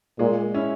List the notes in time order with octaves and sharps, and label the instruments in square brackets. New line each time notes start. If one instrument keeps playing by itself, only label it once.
[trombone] A#2 [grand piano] G#3
[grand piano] C#4 E4